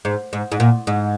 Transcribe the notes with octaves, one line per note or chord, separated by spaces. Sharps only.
G#2
G#2
G#2
A#2
G#2